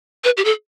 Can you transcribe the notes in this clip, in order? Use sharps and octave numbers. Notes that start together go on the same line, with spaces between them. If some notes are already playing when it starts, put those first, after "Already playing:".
B4
G4
A4